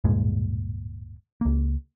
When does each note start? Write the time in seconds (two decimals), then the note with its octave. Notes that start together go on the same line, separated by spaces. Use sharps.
0.04 D1 G2 A#2 G#3
1.41 C#2 A#3